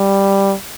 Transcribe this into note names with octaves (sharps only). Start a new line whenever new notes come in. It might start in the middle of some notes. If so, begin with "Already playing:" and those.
Already playing: G3